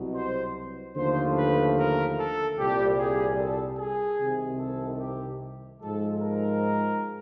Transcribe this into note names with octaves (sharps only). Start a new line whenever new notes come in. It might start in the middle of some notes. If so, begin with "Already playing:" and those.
Already playing: C2 B2 F#3
C5
D#2 D3 F3 A3 C5
B4
A#4
A4
C2 A#2 G3 G4
G#4
A4
G#4
C2 C3 D#3
A4
G4
G#2 F3 G#3 A4
A#4